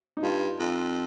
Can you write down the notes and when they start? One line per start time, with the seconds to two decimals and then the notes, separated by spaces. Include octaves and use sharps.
0.17 D#4
0.23 G2 F4
0.60 F2